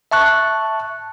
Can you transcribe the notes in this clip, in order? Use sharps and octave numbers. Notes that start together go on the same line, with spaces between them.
E5 A5 C#6 F#6